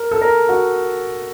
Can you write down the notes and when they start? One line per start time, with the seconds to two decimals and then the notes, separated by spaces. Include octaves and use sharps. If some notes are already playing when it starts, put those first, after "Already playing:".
Already playing: A#4
0.11 A4
0.21 A#4
0.49 F#4